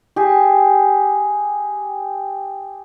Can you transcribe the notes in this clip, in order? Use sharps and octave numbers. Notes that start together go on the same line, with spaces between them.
G4 G#4